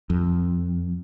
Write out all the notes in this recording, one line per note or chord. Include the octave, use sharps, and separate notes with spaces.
F2